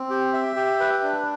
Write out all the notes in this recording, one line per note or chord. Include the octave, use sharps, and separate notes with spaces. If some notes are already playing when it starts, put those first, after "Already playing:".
Already playing: C4
G4
E5
G4
B4
D4